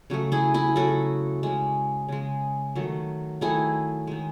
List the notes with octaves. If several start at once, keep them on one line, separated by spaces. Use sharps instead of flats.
C#3 F#3 A3
E4 G#4
E4 G#4
C#3 F#3 A3 F#4 A4
C#3 G#3
C#3 G#3
D#3 F#3 A3
D#3 F#3 A3 E4 G#4
D#3 G#3